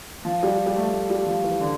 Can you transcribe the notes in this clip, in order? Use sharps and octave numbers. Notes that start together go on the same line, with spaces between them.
F3
G3
G3
A3
A3
G3
F3
E3
D3